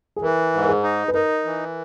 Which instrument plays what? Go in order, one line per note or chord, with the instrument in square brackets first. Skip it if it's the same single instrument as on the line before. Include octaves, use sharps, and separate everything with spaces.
[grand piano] G#4
[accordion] E3 [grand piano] A#4
[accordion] G#2
[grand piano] A#4
G#4
[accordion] D#4
[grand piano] B4
[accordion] D#4 [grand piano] A#4
[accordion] E3